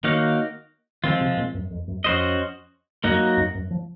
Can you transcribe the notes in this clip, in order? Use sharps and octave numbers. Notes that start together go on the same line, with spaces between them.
D#3 A#3 D#4 F#4 C#5 F5
D#3 F3 G#3 C4 F4
C3
A#2
F#2
F2
F#2
F2 C#4 F#4 C5 D#5
F#2 F#3 A#3 D#4 F#4
F#2
F#2
F3